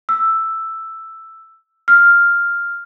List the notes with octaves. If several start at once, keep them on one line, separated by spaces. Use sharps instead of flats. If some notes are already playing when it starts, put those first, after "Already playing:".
E6
F6